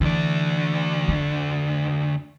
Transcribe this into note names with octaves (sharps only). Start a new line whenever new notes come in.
D2 E3 D4
F2